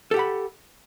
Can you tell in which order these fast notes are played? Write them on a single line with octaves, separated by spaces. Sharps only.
A4 G4 F#5 B5